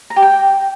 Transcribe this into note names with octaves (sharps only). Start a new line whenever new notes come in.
A#5
G4
G5